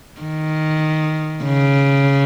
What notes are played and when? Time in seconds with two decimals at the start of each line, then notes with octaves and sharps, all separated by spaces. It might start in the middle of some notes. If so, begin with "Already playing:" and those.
0.21 D#3
1.44 C#3